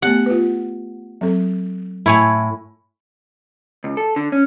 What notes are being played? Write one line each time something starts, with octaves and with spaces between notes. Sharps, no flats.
A3 B3 G4 F#5
F4 B4
F#3 C4 A4
A2 E4 C#5 G#5
C#2
A4
D3
C#4